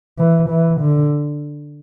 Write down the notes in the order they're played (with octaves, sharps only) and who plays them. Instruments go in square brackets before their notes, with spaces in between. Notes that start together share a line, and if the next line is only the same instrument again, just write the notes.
[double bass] E3
E3
D3